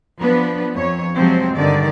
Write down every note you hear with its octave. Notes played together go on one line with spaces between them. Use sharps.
F3 B3 D4 B4
F2 C#5
C3 F3 F#3 G#3 C4 C5
G2 D3 D#3 D5